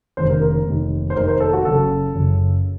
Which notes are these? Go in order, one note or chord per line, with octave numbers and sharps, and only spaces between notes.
F1 D#2 C#3 C5
A#4
A#4
F1 D#2 D#3
C5
F1 D#2 D#3 A#4
C5
A4
F#4
F#1 F#2 C#3 A4
F#1 F#2 C#3